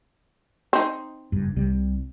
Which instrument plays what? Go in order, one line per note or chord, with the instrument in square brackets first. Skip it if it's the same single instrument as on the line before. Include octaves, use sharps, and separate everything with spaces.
[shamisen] C4 D#4
[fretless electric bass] F#1 G2
C2 C3 G3